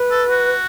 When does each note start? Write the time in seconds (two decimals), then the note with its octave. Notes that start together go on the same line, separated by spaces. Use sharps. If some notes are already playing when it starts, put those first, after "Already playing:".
Already playing: B4
0.11 A4
0.29 F#4